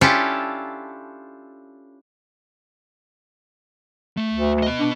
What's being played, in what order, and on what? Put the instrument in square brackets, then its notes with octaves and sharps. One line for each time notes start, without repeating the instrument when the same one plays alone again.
[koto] C#4 D4 E4 F4 G4 A4
[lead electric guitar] A3
[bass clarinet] D2
[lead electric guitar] B3 D#5
[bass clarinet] D4